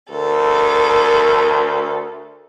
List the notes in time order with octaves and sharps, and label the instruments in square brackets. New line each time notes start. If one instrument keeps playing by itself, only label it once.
[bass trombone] D2 [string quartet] A4 A#4